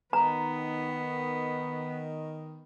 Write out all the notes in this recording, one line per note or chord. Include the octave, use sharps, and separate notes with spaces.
D#3 B3 A#5